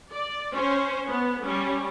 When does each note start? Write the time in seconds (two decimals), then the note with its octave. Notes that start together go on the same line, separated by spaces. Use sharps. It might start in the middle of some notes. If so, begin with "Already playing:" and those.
0.13 D5
0.54 C#4 C5
1.09 B3
1.44 G3 C#4